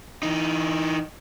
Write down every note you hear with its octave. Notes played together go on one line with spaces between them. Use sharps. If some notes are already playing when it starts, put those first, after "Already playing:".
E3 D#4